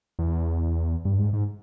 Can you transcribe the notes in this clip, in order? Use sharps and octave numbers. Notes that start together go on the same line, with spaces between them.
E2
G2
G#2
G#2